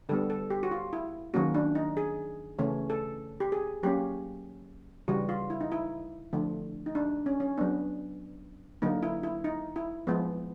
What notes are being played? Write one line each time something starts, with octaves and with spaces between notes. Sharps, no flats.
D3 G3 B3 A4
A4
G4
F#4
F4
E4
D#3 F#3 A#3 C#4 F#4
D4
D#4
G#4
C#3 E3 A3 C#4
A4
G4
G#4
F#3 A#3 C#4 G4
C#3 E3 G3 F#4
F4
E4
D#4
E4
D3 F3 A3
D#4
D4
C#4
C#4
F#3 B3 D4
D3 F#3 A#3 D#4
E4
E4
D#4
E4
F3 G#3 B3